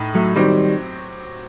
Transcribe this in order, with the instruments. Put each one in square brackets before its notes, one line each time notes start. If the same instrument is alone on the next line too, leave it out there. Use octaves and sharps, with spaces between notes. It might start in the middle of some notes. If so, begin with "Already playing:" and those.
Already playing: [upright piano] A2 D#4
[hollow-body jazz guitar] F#3 A3
[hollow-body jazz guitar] D#3 G3 [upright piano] F#3 C4 G4